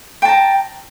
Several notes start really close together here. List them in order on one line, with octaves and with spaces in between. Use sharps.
G5 A5 A#5